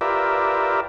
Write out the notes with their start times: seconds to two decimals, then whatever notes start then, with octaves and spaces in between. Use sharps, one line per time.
0.01 F4 G4 A#4 B4 D5 E5